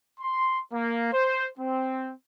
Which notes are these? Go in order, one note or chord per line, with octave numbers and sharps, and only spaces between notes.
C6
A#3
C5
C4